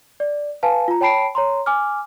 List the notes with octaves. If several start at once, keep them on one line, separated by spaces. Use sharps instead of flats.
D5
B4 F5 G#5 A5
F4 A#5
C#5 G5 A5 B5 C7 D7
C#5 A#5 C6
G#5 D6 F6